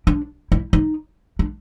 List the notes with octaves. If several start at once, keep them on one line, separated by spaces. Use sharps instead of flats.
D4
E4
D#4
D4